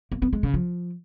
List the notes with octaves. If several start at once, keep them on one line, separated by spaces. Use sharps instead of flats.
A#3
B3
G#3
C#3
F3